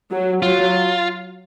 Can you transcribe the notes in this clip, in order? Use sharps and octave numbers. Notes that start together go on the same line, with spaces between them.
F#3
F#3 F4